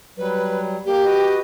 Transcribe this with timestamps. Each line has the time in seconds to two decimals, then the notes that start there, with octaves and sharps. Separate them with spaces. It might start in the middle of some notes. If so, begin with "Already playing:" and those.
0.18 F#3 G3 B4
0.86 A#3 G4
1.05 F#4 B4 D#5